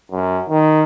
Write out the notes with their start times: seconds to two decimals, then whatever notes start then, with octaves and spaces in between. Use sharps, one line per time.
0.11 F#2
0.49 D#3